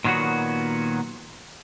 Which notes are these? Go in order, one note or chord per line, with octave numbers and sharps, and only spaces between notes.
A#2 D#3 F#3 B3 F#4